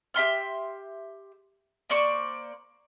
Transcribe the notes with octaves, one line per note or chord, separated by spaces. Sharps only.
G4 E5 C6 F6
A#3 C5 D5 C#6